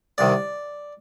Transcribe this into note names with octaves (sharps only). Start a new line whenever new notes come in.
C2 C3 D#3 D5